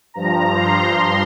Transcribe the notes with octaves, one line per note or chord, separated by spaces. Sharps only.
G2 F3 A#5
C6